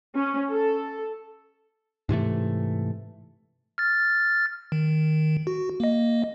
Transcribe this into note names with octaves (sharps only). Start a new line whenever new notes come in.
C#4
A4
G#2 C3 E3 A3
F6 A6
D#3
F#4
A#3 D#5